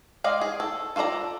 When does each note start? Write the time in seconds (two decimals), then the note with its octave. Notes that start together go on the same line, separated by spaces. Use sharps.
0.24 G#3 D5 D#5 F5
0.41 G#4
0.60 A4
0.96 F4 F#4 A4 D5 A#5